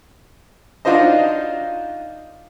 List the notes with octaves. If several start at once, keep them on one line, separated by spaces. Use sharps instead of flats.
D4 D#4 F4 F#4 C5 D#5